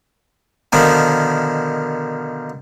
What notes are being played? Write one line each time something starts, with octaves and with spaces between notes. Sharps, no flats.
B2 D3 D#3 F3 B3